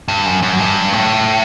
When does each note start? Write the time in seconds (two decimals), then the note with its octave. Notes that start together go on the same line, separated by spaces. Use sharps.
0.08 G2
0.26 F#2
0.43 F#2
0.59 G2
0.93 A2